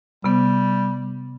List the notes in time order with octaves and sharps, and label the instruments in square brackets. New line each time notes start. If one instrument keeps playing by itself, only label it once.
[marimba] C3 B3 [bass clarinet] G3